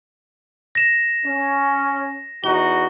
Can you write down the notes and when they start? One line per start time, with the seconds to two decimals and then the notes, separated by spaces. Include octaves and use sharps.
0.75 A#6 E7
1.25 C#4
2.44 E2 D#4 F#4 G7